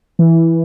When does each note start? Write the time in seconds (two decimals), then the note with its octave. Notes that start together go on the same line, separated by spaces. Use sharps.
0.19 E3